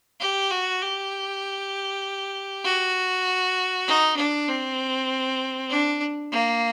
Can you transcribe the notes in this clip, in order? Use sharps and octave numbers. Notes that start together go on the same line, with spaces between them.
G4
F#4
G4
F#4
D#4
D4
C4
D4
A#3